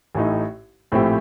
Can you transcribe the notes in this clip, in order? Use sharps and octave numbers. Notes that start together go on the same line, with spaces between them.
A1 A2 A3 D#4
A#1 A2 A3 C4 G4